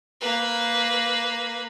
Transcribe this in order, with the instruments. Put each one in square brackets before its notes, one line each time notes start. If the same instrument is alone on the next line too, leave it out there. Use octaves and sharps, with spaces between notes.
[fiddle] A#3 B4